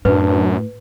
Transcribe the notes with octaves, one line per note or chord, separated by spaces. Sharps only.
F#2 A2 D4 B4